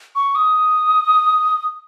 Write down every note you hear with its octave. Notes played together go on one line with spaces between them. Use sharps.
C#6
D#6